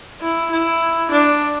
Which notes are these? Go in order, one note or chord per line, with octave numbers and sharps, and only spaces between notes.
E4
E4
D4